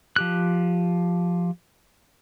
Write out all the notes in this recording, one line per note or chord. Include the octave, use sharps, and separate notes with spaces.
F3 G4 F#6